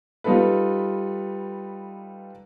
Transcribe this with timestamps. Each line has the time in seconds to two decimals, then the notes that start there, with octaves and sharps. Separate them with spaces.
0.24 G3 D#4 F4 A4 B4